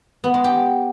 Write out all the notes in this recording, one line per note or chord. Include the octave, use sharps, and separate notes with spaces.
B3
G#3
G4